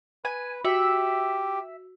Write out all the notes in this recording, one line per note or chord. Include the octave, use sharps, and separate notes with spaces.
B4 G#5
F#4 G4 E5